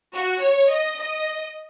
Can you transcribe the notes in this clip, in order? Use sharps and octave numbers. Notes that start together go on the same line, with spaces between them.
F#4
C#5
D#5
D#5